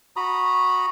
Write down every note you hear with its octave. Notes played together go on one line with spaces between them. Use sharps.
F#4 A#5 B5 D#6